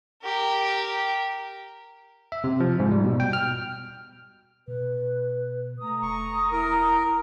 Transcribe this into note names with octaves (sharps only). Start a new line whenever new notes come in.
G4 A#4
E5
C3
F3
G#2
G3
B2
G5
F6
B2 B4
A3 A#5 D#6
E1 C#6
E4 A#4